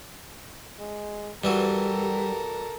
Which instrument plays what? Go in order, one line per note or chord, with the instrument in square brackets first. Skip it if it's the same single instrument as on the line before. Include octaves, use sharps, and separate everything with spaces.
[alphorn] G#3
[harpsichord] G2 E3 F#3 [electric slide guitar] G3 [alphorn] G4 [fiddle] A4 A#4